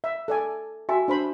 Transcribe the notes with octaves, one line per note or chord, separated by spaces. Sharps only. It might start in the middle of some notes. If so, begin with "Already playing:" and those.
E5
A4 D5 G#5
F#4 E5 G#5
D4 C5 B5